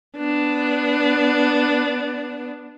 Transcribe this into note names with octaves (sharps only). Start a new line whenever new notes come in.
B3 D4